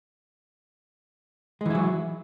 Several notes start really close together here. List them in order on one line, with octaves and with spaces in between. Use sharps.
G#3 E3 E4 F#3